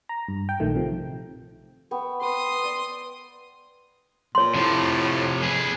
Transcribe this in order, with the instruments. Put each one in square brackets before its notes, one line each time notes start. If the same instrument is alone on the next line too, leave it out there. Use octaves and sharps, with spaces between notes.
[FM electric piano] A#5
G2
G5
A#1 D#3 A3
C3 F3
[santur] B3 G5 C#6
[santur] B4 [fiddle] C6 D#6
[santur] D5
[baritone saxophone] A#2 [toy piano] C#5 C6
[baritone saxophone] A2 [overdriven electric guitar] C3 F3
[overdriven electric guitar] G#4 B4